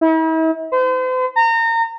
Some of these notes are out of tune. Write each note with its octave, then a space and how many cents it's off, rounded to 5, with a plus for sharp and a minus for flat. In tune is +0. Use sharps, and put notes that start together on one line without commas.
E4 -45
C5 -40
A#5 -30